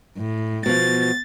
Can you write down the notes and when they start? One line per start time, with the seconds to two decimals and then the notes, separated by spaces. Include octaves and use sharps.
0.17 A2
0.66 B2 F3 A6